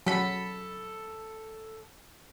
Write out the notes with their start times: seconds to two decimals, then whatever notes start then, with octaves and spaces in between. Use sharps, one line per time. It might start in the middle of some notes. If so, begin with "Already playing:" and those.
0.07 F#3 A4 B5